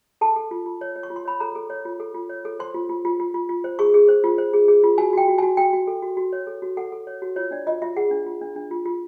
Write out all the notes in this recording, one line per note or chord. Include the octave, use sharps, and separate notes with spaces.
A4 A5
A4
F4
F4
C#5
C#5
C#6
F4
C6
C#5 B5
A4 A#5
A4
C#5
F4
A4
F4
C#5
A4
C5 C6
F4
F4
F4
F4
F4
F4
C5
G#4 C#6
G#4
C5
F4
C5
G#4
G#4
F4
F#4 G#5
F#4 G5
F#4
F#4 G#5
F#4 G5
F#4
A4
F#4
F#4
C#5
A4
F#4
A4 F#5
A4
C#5
F#4
F4 C#5
D4 D5
F4 D#5
F4 E5
G#4 F#5
D4
F4
D4
D4
F4
F4